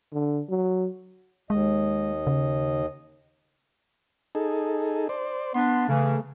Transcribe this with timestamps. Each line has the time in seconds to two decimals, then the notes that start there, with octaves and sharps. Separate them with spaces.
0.13 D3
0.49 F#3
1.50 D#2 G#3 D#5
2.27 C#3
4.35 D#4 G#4 A4
5.09 C5 D5
5.54 B3 D4 C6
5.89 C#3 E3 A3